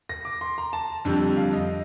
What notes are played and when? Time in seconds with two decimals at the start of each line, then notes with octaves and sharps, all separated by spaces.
0.09 A#6
0.25 D6
0.41 C6
0.58 A#5
0.73 A5
1.05 F2 D3 G3
1.37 F5
1.53 D#5